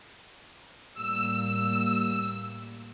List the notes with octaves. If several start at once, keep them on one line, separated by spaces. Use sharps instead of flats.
A2 G3 A#3 E6